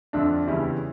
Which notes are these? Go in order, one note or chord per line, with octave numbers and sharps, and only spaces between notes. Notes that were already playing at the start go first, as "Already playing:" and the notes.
F2 D3 A3 D4
E2 C#3 G3 C#4 E4